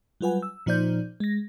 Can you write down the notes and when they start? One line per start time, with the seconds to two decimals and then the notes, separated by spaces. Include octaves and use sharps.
0.21 F#3 G3 F4 B4 F#5 G#5
0.42 E6
0.66 A#2 F3 D#4 C5 D5 G6
1.20 G#3 A#6